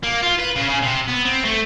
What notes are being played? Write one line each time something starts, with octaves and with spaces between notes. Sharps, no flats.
A#3
F4
B4
C#3
C#3
C3
B3
C4
A3